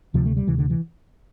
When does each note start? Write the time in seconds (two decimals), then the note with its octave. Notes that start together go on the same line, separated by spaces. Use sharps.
0.14 D2 C3 F3
0.25 A3
0.37 G3
0.47 D2 C3 E3
0.58 D3
0.70 E3